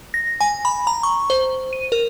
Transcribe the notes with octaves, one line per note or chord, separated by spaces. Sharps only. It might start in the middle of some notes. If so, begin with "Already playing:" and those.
A#6
G#5
B5
A#5
C#6
C5
D#7
A#4